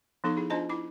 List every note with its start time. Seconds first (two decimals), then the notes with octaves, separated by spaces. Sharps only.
0.24 F3 B3 D#4 A4 C#6
0.37 E4 G#4
0.50 D4 F4 C5 D#5 A5 A#5
0.69 E4 D6